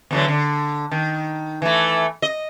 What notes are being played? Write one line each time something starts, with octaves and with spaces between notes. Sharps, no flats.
E2 D3 F#3
D3
D#3
E3 A3
D#5